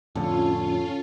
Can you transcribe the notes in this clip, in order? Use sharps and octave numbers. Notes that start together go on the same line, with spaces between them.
F2 A2 D3 C#4 F4 A4